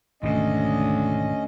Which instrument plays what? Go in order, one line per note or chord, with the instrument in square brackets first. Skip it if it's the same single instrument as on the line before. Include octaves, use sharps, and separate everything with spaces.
[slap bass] G#1 B2 [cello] D2 [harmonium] C#4 D#5